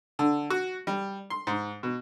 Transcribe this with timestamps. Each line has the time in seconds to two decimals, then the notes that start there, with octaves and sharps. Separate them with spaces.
0.19 D3
0.50 F#4
0.87 G3
1.30 C6
1.47 G#2
1.83 B2